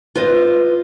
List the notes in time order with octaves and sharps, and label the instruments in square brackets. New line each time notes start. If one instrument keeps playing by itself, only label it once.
[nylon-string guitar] F4 B4 C5 D#5